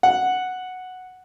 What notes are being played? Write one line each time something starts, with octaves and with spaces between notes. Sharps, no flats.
F#5